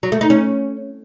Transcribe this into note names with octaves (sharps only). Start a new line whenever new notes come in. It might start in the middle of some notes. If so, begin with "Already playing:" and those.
F#3
A3
D#4
C#4